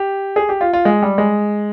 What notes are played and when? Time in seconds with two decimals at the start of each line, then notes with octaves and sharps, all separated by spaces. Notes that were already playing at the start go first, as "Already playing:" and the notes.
Already playing: G4
0.36 G#4
0.49 G4
0.61 F4
0.73 F4
0.85 G#3
1.02 G3
1.18 G#3